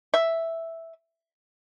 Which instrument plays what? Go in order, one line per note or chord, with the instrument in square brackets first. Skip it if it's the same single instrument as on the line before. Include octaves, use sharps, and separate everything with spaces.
[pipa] E5